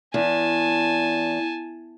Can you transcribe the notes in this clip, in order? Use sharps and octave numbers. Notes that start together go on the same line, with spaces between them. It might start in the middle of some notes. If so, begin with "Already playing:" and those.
E2 G#5 A5